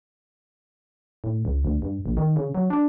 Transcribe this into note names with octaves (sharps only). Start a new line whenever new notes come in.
A2
C#2
D2
G2
A#1
D#3
C#3
F#3
D4